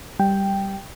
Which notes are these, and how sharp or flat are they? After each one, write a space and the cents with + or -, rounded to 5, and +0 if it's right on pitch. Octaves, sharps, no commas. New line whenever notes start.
G3 +0 G5 +0